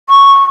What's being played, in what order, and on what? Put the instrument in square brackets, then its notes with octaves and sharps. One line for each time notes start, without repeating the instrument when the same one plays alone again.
[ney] C#6